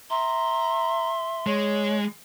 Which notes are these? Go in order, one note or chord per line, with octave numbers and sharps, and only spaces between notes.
E5 A#5 C6
G#3 C#5